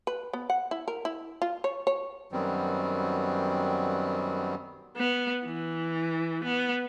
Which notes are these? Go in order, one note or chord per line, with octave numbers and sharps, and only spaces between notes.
B4
B3
F#5
E4
A#4
E4
F4
C#5
C#5
F#2 D#3 F#3 G3 B3 C4
B3
E3
B3